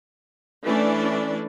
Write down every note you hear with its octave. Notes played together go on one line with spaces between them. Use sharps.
E3 A3 C#4 D4 D5